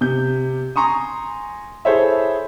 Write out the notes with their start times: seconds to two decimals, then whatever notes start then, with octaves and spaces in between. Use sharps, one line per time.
0.01 C3 G6
0.76 G#5 A#5 C6 C#6 D#6
1.85 E4 G#4 A4 C5 C#5 E5